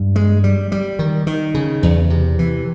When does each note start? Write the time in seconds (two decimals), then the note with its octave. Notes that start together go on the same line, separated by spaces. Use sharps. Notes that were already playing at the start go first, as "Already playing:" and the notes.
Already playing: G2
0.16 G#3
0.44 G3
0.72 G3
0.99 D#3
1.27 D#3
1.55 C#3
1.83 E2
2.10 C3
2.39 E3